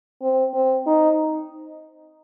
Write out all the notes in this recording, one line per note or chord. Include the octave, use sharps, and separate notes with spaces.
C4
C4
D#4